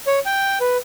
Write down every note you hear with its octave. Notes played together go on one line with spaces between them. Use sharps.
C#5
G5
B4